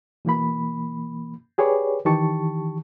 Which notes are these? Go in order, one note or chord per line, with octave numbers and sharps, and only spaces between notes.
B2 E3 A#3 B5
G4 G#4 B4 C#5 D5
D#3 E3 G4 A5 C#6